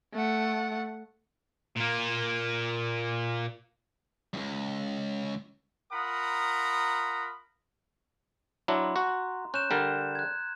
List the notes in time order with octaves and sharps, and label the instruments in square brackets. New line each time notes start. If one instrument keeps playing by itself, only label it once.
[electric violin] A3 F#5
[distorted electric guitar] A#2 A#3
[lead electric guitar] C#2 G2
[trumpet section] F4 A#4 F#5 A#5 B5 D#6
[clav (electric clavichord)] F#3 D4 E4 [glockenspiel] A#5 C6
[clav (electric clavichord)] F#4
[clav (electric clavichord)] C#4 [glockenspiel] F#6 G6 E7
[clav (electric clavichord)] D3 G3 A#4
[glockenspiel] F#6 G#6